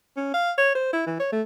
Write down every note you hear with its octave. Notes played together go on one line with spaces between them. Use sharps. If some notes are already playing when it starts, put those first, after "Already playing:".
C#4
F5
C#5
C5
E4
E3
C#5
A3